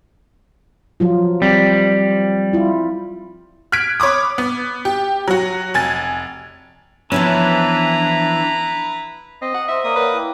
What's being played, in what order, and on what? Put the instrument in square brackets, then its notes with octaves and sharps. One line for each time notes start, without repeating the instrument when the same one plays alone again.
[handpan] F3 F#3 F4
[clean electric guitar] G3 [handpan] C4
[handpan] E4 F4
[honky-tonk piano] F6 F#6 G#6 B6 D7
C#5 B5 D6 D#6
B3
G4
F#3 F#4
F1 G#5 A6
[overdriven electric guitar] E3 [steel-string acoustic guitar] F3 B3 C#4 [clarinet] D4 [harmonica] E4 B4 A#5
[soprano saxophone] C4 [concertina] D#5
[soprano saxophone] F#5 [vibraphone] A#5
[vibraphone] C5 C6 [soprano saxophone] E5
[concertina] A#3 D#6 [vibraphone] C#5 D5
[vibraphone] A#4 F5 F#5 [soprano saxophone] B4
[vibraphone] E4 G5